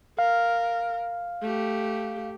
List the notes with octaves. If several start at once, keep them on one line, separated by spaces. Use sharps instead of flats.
A#4 F5
A3 G4